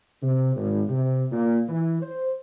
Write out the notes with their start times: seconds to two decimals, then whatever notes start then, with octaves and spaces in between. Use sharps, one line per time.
0.22 C3
0.56 G#1
0.88 C3
1.32 A#2
1.69 E3
2.02 C5